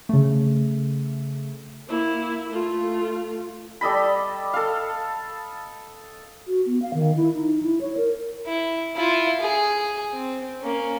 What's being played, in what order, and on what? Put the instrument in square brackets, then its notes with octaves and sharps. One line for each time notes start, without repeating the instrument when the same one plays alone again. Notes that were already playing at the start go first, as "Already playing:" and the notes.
[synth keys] C#3 A3
[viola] A#3 E4
A3 F4
[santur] G3 A4 D#5 B5
A4 F5
[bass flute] F#4
B3
F5
D#3
E4
D#4
E4
C#5
A#4
[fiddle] E4
E4 F4
G#4
C4
A#3 C#4